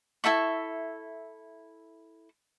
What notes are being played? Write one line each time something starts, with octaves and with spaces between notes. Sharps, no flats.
E4 A4 E5 C#6